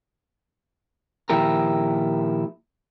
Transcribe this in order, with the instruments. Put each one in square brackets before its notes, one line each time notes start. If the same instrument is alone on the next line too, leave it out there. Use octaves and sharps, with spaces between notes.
[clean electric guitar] A#2 D#3 F3 E4 G4 A#4